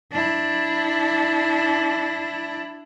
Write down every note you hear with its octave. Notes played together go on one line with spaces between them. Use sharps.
D4 E4